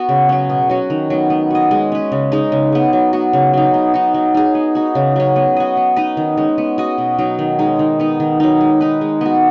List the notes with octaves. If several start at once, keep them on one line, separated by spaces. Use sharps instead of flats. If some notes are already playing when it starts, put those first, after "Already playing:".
Already playing: B3 F#4 B4
C#3
F#3 C#4
B2
F#3 C#4 F#4
D#3
F#3 B3
B3
F#4 D#5
G#3
C#4 B4
C#3
G#3 D#4
C#3
G#3 B3
F#3
B3 F#4
C#3
F#3 D#4
B3
D#4 F#4
F#3
D#4 G#4
B3
D#4 F#4
C#3
F#3 C#4
B3
F#4 D#5
B3
D#4 B4 D#5
D#3
G#3 C#4
B3
F#4 D#5
B2
F#3 D#4
D#3
G#3 D#4
D#3
B3 D#4
D#3
F#3 D#4
G#3
D#4 B4
G#3
B3 F#4